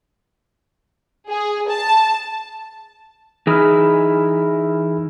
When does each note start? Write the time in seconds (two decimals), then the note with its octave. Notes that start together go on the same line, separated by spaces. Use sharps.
1.29 G#4
1.69 A5
3.47 E3 D#4 E4 G#4 B5 F6